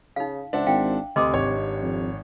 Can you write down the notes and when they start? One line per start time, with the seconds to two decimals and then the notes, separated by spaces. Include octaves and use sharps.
0.16 C#3 D#4 F5
0.53 C#2 D4 C5 E5 F#5
0.67 G#1 F5 G5
1.16 D2 G2 C3 D#5 C6 D6 D#6
1.33 G#1 C#5
1.83 F2